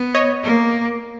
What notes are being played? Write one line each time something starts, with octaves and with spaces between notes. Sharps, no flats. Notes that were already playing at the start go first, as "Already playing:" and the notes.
Already playing: B3
C#5 D#5
A#3